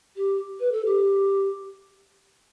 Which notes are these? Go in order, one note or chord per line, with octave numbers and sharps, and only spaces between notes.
G4
B4
A4
G4